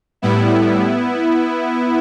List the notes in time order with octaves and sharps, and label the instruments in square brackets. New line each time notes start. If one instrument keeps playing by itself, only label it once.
[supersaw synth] A2 G3 B3 E4